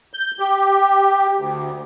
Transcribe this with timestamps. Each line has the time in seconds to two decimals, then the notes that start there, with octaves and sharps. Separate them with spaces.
0.14 G6
0.40 G4
1.38 D2